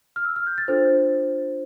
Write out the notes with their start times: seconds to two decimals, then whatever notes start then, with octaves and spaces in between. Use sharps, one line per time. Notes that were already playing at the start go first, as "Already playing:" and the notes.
0.16 F6
0.25 E6
0.36 F6
0.47 G6
0.58 A6
0.68 D4 F4 A4 C5